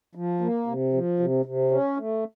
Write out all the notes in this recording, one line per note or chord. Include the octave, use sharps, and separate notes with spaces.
F3
A#3
C3
F3
C3
C3
C#4
A3